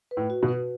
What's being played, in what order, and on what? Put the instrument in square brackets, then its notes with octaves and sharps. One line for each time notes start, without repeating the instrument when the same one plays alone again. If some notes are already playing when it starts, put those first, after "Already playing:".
[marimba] B4
[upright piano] A2
[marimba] F#4
[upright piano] B2
[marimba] B4